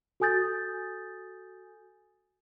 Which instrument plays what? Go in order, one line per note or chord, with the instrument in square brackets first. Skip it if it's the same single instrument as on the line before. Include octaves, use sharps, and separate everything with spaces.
[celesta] F#4 A4 G#5 D#6 G6 A6